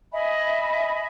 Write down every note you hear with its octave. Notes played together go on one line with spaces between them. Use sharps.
D#5 E5 G#5 B5